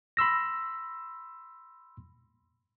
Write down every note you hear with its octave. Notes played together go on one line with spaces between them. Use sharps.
B5 C6 E6 A#6